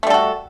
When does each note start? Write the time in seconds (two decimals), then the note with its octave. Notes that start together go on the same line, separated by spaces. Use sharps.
0.03 A3
0.07 G3
0.10 A4
0.14 F#4